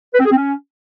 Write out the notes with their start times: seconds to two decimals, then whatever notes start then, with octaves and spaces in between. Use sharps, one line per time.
0.14 B4
0.20 C4
0.25 G#4
0.31 C4
0.37 C#4